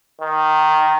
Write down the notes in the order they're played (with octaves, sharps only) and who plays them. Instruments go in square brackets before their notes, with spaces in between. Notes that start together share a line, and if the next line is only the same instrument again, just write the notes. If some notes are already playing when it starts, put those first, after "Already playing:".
[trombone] D#3